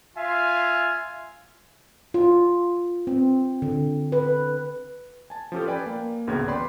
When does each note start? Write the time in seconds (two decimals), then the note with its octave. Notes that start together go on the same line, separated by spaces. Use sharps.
0.17 F4 E5 F5 G#5
2.14 F4
3.07 C4
3.62 D3
4.12 B4
5.30 G#5 A5
5.52 F3 C#4 G4 A4
5.67 B4 D5 G5 G#5 B5
5.86 A#3
6.27 A1 D2 C#3 B3 G5 G#6
6.48 B4 C#5 D5 G5 B5 C6